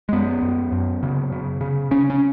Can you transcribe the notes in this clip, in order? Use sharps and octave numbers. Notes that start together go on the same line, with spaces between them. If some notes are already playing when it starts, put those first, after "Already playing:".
G#3
F#2 B3
F#2
F#2
C#3
C#3
C#3
C#3 C#4
C#4